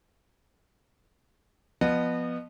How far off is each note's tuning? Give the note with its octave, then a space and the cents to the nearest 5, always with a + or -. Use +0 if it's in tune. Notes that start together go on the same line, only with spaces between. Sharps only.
F3 +0 B3 +0 D#5 -30